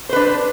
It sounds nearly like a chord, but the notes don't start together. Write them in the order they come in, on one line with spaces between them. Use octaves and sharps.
C5 B4 D4